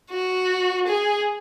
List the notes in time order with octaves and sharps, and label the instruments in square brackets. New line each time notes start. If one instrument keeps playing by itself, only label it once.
[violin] F#4
G#4